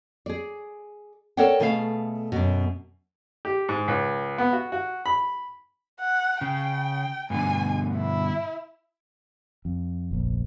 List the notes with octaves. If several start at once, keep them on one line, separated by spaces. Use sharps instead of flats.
G#4 D5
A4 A#4 C#5 D5 F#5 G5
B2 A3 G#4 A4 C#5 F5
F#2 B2
G4
G#2
C#2
B3
F#4
F#4
B5
F#5
C#3 G5
G2 B2 D3 G#5
E4
F2
F1 A#1